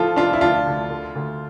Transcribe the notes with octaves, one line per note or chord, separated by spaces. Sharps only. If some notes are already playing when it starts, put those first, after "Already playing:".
Already playing: A1 E3 F3 F4 A4
F1 D4 F4
E4
D2 D4 F4
D2
D3
D2